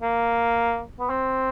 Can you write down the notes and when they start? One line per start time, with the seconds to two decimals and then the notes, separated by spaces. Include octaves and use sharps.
0.02 A#3
1.00 B3
1.10 C4